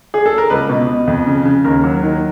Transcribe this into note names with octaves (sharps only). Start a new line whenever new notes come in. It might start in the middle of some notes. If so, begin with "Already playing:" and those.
G#4
A4
A#4
C#2 B4
B2
B2
F2
C#3
C#3
D#2 A#4
F#3
D#3